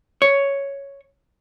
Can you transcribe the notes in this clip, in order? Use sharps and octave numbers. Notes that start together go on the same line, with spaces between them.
C#5